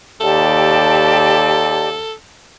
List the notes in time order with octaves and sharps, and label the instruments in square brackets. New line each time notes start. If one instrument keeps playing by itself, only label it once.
[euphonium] D#2 [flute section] G4 D5 A5 [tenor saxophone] A4